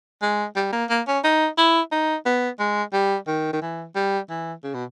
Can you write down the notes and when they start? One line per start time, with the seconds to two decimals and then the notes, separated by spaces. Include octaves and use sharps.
0.22 G#3
0.56 G3
0.73 A#3
0.90 A#3
1.07 C#4
1.24 D#4
1.58 E4
1.92 D#4
2.26 B3
2.59 G#3
2.93 G3
3.27 D#3
3.53 D#3
3.62 E3
3.95 G3
4.29 E3
4.63 C#3
4.74 B2